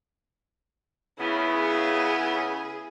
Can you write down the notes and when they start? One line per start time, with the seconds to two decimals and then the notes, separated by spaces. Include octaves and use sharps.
1.20 C#3 B3 E4
1.54 G#4